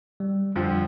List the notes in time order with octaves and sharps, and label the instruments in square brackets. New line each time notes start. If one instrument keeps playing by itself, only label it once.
[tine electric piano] G3
[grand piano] F2 D3 F3 [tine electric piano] G3